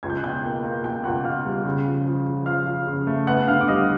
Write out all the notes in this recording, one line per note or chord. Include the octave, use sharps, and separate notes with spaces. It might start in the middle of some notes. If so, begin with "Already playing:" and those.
C#2 G#6
G6
F#6
B2 G5 G6
A#3
A#3
B2 G5 G6
C#2 F#5 F#6
B2 F5 F6
G3
C#3
F3
F3
F3
F3 F5 F6
F3
C#3
A3
B3 F#5 F#6
D3 F5 F6
D6
G3 D#5 D#6